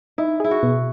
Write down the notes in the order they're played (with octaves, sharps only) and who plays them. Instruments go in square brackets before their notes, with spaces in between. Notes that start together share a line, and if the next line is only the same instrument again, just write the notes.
[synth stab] D#4 [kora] E4
[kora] E4 [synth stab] G#4
[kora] F#4
[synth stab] B2